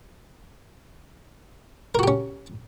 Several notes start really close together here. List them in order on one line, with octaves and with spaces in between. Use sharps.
A#4 F#4 G4 C#4